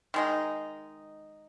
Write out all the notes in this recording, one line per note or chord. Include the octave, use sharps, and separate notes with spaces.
D#3 G#3 D#4